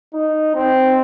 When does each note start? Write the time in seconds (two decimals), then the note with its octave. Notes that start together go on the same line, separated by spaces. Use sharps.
0.14 D#4
0.55 C4